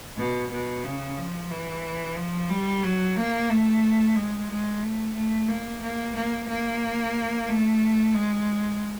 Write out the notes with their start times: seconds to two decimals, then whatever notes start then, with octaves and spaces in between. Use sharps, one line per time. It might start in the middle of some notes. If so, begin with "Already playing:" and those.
0.18 B2
0.51 B2
0.84 C#3
1.17 F3
1.51 E3
2.16 F3
2.50 G3
2.83 F#3
3.16 A#3
3.50 A3
4.16 G#3
4.50 G#3
4.83 A3
5.15 A3
5.49 A#3
5.83 A#3
6.15 A#3
6.48 A#3
7.48 A3
8.15 G#3